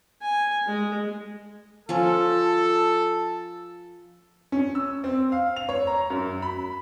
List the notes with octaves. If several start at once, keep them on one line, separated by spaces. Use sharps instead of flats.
G#5
G#3
F3 C#4 A4
C#4
E6
C4
F5
F7
C#5
A#5
F#2
B5